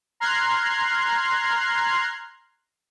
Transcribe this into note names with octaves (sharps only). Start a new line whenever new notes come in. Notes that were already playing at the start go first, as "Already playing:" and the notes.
A#5 C6 F6 F#6 G#6 C7